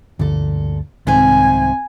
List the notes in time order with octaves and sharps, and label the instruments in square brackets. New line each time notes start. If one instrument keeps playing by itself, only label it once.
[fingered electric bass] G1 D2 [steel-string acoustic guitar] A#2 A4
[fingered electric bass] C2 G#2 D#3 [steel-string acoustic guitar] C4 C5 E5 [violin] G#5